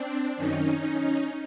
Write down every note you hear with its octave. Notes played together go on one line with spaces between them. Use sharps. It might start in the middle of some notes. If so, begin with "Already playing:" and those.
Already playing: C4 D4
F#2 D#3 C#4 D#4